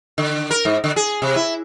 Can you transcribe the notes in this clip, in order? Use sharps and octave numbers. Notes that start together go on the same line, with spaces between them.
D3
A#4
G#2
D3
G#4
C3
E4